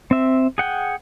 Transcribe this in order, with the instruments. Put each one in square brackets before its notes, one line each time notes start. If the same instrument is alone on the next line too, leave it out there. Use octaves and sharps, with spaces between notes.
[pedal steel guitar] C4 E5
G#4 F#5 G5